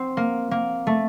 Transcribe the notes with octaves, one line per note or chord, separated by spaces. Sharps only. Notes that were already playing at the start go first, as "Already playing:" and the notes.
Already playing: C4
A#3
A#3
A3